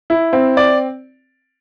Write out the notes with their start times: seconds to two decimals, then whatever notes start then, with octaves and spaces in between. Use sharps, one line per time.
0.10 E4
0.33 C4
0.57 D5